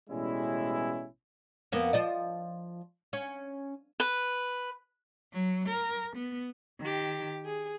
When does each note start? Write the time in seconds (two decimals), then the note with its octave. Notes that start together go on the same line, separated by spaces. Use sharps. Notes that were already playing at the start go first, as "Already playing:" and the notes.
0.10 A1 B2 G3 G#3 C#4 E4
1.72 F2 A#3 B3
1.93 F3 D5 D#5
3.13 C#4
4.00 B4
5.33 F#3
5.68 A#4
6.16 B3
6.80 D#3 G4
7.45 G#4